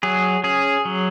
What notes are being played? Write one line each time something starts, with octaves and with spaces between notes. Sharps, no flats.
F#3 G#4
C#4 G#4
F#3